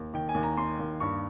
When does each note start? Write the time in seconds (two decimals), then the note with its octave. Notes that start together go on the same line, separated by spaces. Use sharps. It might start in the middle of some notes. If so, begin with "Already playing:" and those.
Already playing: D#2
0.14 D#3 G5
0.29 G#5
0.35 D#2
0.43 A#5
0.57 A#3 C6
0.79 D#2
1.00 G2 C#6